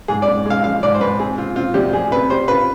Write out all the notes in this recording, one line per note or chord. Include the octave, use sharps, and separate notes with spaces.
G#2 G#4
D5
G#2
G#3 F5
F3 F5
G#2 D5
C5
G#2 B4
C4 G#4
C4 F4
C4 F4
D2 G4
F3 G#4
C3 B4
G3 C5
F4 B4